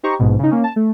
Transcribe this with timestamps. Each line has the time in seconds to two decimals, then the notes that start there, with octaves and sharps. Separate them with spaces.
0.03 D#4 G4 C5 A#5 C#6
0.19 A#1 G#2 B2
0.39 C#3 D#4
0.51 A#3 C#4
0.64 A5
0.76 A3